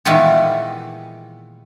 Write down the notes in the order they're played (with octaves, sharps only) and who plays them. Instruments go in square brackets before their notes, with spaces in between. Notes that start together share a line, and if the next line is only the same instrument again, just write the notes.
[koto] A#2 D#3 E3 G3 G#3 B3